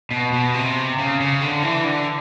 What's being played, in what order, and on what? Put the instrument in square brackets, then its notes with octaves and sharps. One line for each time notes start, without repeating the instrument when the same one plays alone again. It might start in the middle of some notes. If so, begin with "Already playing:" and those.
[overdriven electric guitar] B2
B2
C3
C#3
C#3
D3
E3
D3